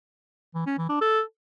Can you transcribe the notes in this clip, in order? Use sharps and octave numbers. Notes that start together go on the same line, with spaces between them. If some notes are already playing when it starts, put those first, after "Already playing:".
E3
C#4
E3
D4
A4